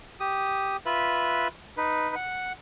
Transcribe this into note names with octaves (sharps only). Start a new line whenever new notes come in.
G4 D#6
F4 B4 E5 F#6
D#4 B4
F#5